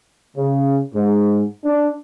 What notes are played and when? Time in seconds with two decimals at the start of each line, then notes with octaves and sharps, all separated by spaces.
0.36 C#3
0.94 G#2
1.64 D4